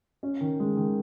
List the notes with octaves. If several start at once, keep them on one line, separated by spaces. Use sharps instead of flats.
C#4
D#3
G#3
D#3